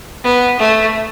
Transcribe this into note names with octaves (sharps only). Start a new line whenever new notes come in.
B3
A3